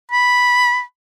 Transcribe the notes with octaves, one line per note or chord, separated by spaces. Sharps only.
B5